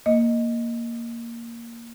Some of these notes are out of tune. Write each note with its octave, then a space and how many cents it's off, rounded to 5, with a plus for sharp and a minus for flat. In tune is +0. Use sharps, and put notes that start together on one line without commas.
A#3 +0 D#5 +0